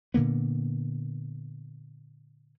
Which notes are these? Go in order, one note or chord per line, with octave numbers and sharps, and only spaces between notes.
A#2 D3 A#3 B3